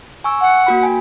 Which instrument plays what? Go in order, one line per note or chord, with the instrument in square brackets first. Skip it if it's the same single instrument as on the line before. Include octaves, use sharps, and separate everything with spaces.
[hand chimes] G#5 C#6 E6
[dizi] F#5
[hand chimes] A#3 F#4 B5
G5 G#5